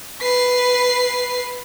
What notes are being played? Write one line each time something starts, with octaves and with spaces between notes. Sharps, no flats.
B4 C7